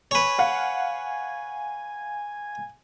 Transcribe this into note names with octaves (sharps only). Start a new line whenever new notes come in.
B4 C#5 G#5
F5 F#5